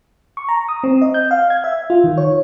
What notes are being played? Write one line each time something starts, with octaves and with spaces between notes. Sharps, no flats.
C#6
A#5
D#6
C4
D#5
G6
F5
G#6
E5
F4
D#3
C#5